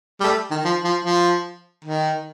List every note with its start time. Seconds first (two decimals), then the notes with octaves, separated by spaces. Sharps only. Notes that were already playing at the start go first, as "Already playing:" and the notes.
0.20 G3
0.24 A3
0.51 D#3
0.65 F3
0.84 F3
1.05 F3
1.85 D#3